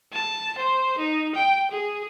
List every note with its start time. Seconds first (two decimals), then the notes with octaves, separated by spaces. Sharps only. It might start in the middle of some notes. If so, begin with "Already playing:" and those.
0.13 A5
0.58 C5
0.98 D#4
1.35 G5
1.71 G#4